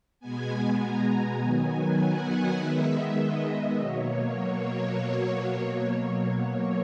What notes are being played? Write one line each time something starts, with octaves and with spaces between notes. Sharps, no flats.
B2 G#3 B3 G#5
A#5
D#3 F#3 B3 G#5
F#5
D#3 G#3 B3 E5
D#5
B2 F#3 A#3 C#5